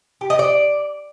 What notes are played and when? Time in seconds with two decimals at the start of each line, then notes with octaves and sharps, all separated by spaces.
0.21 G4
0.30 D#5
0.39 D5